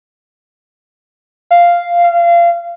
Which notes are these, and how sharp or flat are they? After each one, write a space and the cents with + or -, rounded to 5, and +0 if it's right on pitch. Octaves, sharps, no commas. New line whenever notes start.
F5 -5
F5 -25